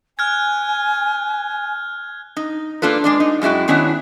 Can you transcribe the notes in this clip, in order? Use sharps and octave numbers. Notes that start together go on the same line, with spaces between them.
G#5 F6 F#6 G#6
D#4
A#3 D4 F4 A4 B4
G#3 D4 D5
D#4
F#2 G#3 E4 F#4 G5
D#3 B3 C#4 D4 E4 F#4